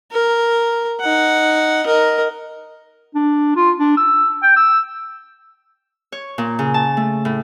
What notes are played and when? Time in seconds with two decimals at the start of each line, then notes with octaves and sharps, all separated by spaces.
0.12 A#4
1.01 D#4 F#5
1.86 A#4 D#5
3.15 D4
3.56 F4
3.79 D4
3.97 E6
4.43 G5
4.57 E6
6.12 C#5
6.38 A#2
6.59 C#3
6.74 A5
6.97 A3
7.25 A2